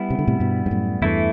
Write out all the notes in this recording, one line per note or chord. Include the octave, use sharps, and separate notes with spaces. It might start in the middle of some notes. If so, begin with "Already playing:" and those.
Already playing: G3 B3 E4
C3
D3
A2 C3
G2 B2
G2
F#2 A2
E2 G2 E3 A3 E4